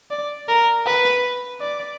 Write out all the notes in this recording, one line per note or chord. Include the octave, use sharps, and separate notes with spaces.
D5
A#4
B4
D5